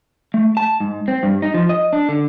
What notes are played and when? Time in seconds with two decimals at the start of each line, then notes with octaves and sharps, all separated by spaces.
0.34 A3
0.57 A5
0.80 G#2
1.08 C4
1.23 G2
1.42 D#4
1.54 F3
1.69 D#5
1.93 D4
2.09 D3